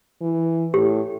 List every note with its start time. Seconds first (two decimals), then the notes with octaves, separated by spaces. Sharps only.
0.21 E3
0.74 A2 G4